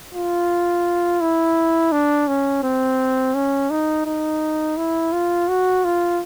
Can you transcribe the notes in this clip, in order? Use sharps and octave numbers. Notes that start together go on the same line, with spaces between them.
F4
E4
D4
C#4
C4
C#4
D#4
D#4
E4
F4
F#4
F4